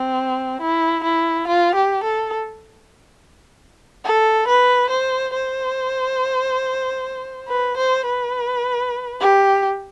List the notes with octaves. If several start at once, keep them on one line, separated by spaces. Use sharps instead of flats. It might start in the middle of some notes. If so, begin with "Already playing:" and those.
Already playing: C4
E4
E4
F4
G4
A4
A4
B4
C5
C5
B4
C5
B4
G4